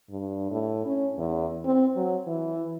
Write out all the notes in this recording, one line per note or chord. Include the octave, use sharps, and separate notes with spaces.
G2
A2
C#4
E2
C4
F#3
E3